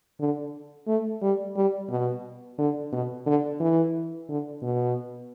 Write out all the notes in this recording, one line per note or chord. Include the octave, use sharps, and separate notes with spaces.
D3
A3
G3
G3
B2
D3
B2
D3
E3
D3
B2